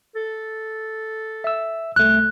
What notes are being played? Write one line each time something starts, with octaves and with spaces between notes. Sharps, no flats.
A4
E5 E6
C2 A3 F#6